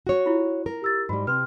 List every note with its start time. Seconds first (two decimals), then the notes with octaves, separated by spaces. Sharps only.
0.07 F#4 C#5
0.26 E4 F4
0.66 A#4
0.82 G4 E6 A6
1.09 G#2 G3 F#4 B5
1.27 C3 B4 C6 F6